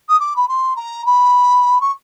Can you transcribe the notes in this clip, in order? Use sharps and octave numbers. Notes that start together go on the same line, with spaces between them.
D#6
D6
B5
C6
A#5
B5
C#6